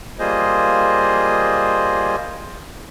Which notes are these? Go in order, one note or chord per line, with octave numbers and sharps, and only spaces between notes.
G3 A#3 F4 G#4 C5 D#5